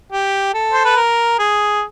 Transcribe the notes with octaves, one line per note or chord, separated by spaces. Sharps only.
G4
A4
C5
B4
A#4
G#4